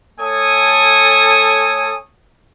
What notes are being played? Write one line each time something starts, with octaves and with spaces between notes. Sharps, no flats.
A3 A4 C#5 G#5 D#6